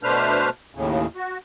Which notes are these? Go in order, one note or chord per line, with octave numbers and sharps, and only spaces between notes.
B2 A3 D4 B4 C5 F6
D#2 A2 C#3
F#4